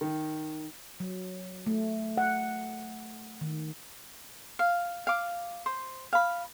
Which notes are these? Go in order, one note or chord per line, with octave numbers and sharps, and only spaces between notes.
D#3
F#3
A3
F#5
D#3
F5
F5 D6
C5
F5 B5